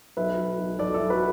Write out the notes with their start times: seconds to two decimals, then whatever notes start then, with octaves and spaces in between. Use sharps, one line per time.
0.17 B1 B4 E5
0.38 B1
0.58 B1
0.79 B1 A4 D5
0.94 E4 A4
1.00 B1
1.10 F#4 B4